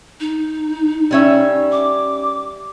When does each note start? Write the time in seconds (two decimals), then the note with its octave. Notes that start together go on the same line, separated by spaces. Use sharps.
0.20 D#4
1.11 G3 C#4 E5
1.72 D6